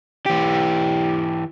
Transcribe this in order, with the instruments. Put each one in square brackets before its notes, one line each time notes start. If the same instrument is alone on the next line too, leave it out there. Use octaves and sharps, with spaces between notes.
[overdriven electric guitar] E3 G4